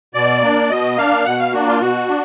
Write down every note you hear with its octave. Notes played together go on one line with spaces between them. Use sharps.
B2 D5
A#3 D4
B2 D#5
A#3 D4 F5
B2 F#5
F5
A#3 D4 F#4
F4
B2 F#4
D4